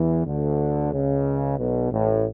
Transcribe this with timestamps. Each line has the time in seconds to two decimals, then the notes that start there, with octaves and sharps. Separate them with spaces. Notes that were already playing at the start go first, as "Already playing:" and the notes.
Already playing: E2 E3
0.25 D2 D3
0.93 C#2 C#3
1.58 B1 B2
1.91 A1 A2